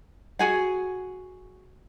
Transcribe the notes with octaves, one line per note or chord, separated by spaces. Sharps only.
F#4 G#4 F#5